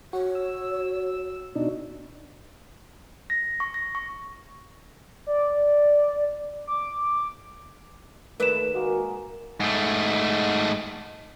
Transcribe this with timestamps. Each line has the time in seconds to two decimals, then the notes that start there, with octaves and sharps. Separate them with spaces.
0.13 F#4 C#5
0.35 E6
1.55 B2 D4 D#4 F#4
3.30 A#6
3.60 C#6
3.74 A#6
3.95 C#6
5.27 D5
6.67 D6
8.40 D#2 A3 A#4 B4 D5 E7
8.74 G#3 A#3 F#4
9.60 G#2 A3